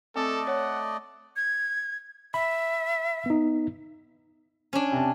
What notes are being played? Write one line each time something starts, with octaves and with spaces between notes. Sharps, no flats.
A3 C4 A4 D5 D#5
C#5 F#5
G#6
E5 B5
B3 D#4
C#4 D4
C3 A5